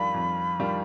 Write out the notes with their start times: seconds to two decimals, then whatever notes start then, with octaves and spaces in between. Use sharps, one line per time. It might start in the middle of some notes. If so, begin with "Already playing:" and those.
Already playing: F2 D#3 G3 D4 F4 B5
0.14 F2
0.59 D#3 G3 D4 F4